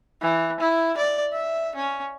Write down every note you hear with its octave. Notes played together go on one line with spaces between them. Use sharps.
E3
E4
D5
E5
C#4